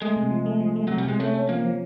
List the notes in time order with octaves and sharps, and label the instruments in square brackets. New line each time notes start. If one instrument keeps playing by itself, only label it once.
[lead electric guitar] G#3 [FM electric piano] A3
[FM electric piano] C3
F3
A3
F3
A3
[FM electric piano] C3 [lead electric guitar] F#3
[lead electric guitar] G3
[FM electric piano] C3 [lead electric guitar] G#3
[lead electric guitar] A3 [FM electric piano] C#4
[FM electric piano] C#4
[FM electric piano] F3 [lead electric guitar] A#3
[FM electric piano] F3